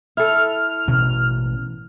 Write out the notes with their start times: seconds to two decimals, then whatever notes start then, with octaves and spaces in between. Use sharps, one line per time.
0.17 E4 A4 F6
0.87 A1 B2 C#4